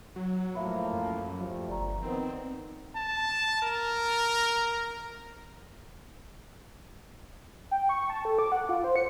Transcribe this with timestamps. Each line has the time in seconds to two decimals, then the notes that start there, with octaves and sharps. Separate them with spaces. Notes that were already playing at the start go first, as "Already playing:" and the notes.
0.16 F#3
0.55 A2 F3 A#3 E5 B5
0.93 F#2
1.40 F3 G3 A3
1.69 G1 D5 A#5
2.03 D#3 B3 C4
2.96 A5
3.63 A#4
7.71 G5
7.89 C#6
8.10 A5
8.25 A4
8.39 D6
8.52 F#5
8.69 F4
8.84 C5
8.96 C#7